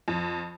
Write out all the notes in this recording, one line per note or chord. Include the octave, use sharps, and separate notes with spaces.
F2